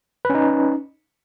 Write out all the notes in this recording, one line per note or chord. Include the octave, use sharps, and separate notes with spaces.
C#4 D#4 B4